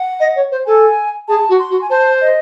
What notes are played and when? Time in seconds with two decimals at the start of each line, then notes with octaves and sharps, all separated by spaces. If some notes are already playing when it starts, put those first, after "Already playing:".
Already playing: F#5
0.20 D#5
0.35 C#5
0.51 C5
0.66 A4 G#5
1.28 G#4 A5
1.49 F#4
1.59 C6
1.70 F#4
1.81 G#5
1.90 C5 A5
2.21 D#5